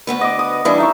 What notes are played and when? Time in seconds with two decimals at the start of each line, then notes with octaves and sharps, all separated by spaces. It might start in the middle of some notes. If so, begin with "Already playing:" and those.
0.07 D2 B3 B4
0.21 D5 D#5
0.39 D#6
0.65 E3 G3 D4 E4
0.78 D#4 E5 C#6